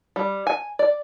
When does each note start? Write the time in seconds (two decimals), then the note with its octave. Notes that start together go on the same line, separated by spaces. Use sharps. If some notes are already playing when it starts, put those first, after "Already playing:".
0.16 G3
0.47 G#5
0.79 D5